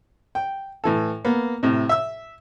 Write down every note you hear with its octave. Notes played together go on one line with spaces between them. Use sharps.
G5
A2 E3 A4
A#3 B3
A2 C3
E5 E6